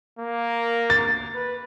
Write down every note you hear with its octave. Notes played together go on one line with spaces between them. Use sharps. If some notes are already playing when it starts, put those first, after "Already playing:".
A#3
A6
B4